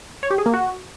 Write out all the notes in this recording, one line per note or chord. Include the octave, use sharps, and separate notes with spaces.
C#5
G4
G#4
A#3
F#4